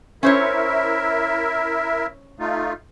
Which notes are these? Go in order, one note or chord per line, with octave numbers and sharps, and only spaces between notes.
C#4 E4 A#4 C5 C#5 E5
A3 D#4 F4